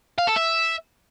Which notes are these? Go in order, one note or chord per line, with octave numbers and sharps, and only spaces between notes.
F5
A4
E5